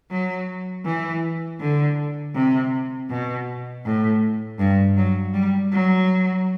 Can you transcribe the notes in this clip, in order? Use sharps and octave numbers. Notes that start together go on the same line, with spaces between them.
F#3
E3
D3
C3
B2
A2
G2
F#3
G3
F#3